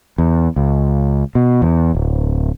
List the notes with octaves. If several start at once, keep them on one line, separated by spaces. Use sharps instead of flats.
E2
C#2
B2
E2
D1